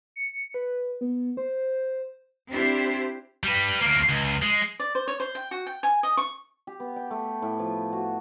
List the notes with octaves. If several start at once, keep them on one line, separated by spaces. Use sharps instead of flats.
C#7
B4
B3
C5
C4 D4 E4 G4 C5
G3 B4
D2 A#3
C#2
G#3
D5
C5
C#5
C5
G5
F#4
G5
G#5
D#5
C#6
G4
B3
G5
A3
A2
F3
F#4